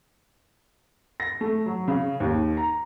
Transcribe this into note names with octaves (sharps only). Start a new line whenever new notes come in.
A#6
A3
F#3
C#3
D#2
A#5